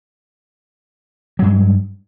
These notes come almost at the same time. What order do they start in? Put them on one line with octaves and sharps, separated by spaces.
F#3 G2 G#3